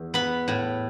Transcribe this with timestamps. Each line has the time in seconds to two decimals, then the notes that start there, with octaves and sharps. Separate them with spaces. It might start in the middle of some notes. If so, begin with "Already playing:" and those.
Already playing: E2
0.14 B3 B5
0.48 A2